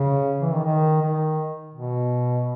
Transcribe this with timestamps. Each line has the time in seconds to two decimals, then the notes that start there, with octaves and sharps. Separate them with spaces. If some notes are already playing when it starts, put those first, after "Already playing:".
Already playing: C#3
0.41 E3
0.53 D#3
0.65 D#3
1.02 D#3
1.74 B2